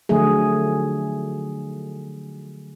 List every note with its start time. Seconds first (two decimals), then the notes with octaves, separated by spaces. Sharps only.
0.09 D3 F3 F#3 A3 G#4